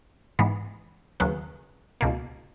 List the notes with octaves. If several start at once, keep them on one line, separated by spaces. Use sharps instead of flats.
G#2 E3 G#3 B3
D#2 C#3 F#3 B3
C#2 B2 A#3